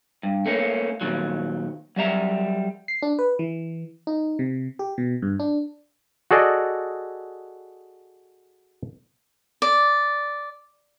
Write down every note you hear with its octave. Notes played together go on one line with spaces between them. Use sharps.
G2
A3 A#3 C#4
A#2 D#3 F#3
F#3 G3 E5 A#5
C7
D4
B4
E3
D#4
C3
G4
B2
G2
D4
F#4 G#4 A4 D5 D#5
D5